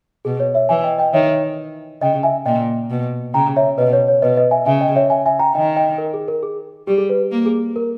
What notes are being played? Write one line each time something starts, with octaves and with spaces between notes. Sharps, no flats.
B2 G#4
C#5
C#5 E5
E3 E5 G#5
D#5 G5
D#5 G5
D#3 C#5 E5
C#3 D#5 G5
E5 G#5
A#2 D#5 G5
B2
C#3 G5 A#5
C#5 E5
B2 B4 D#5
C#5
C#5
B2 B4 D#5
B4 D#5
E5 G#5
C#3 E5 G#5
D#5 G5
C#5 E5
E5 G#5
E5 G#5
G5 A#5
D#3 D#5 G5
D#5 G5
A#4
G#4
A#4
G#4
G3 G4
G#4
B4
A#3
G#4
A#4